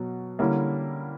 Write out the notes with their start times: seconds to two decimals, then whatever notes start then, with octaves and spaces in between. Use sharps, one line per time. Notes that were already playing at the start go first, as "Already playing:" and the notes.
Already playing: B2 F#3
0.39 D3 G3 A#3 C#4 E4